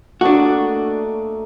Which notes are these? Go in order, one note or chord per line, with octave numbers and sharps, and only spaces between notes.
A3 A#3 D4 F#4 D#5